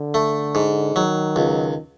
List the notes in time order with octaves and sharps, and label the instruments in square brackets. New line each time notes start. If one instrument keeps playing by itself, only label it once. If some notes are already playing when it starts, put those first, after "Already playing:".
Already playing: [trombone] D3
[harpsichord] A3
G#2
[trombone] D#3 [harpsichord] F#3
[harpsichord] C#2